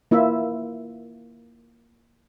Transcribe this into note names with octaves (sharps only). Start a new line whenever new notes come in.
A#3 E4 F4 E5